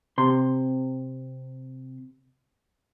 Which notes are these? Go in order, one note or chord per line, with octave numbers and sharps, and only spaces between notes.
C3 C6